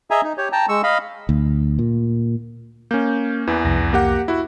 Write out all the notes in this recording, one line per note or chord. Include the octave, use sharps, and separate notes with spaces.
G#4 D#5 E5 G#5 A#5
D#4
G4 C#5
G5 A5 A#5
G#3 C#6 E6
D#5 F5 B5
D2
A#2
A#3 C#4 G6
E2 E3
C2 F2 A#6
A#3 G4 F#5
E4 F#4